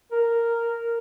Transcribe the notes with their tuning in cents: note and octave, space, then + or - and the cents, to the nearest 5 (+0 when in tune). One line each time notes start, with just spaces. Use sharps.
A#4 -5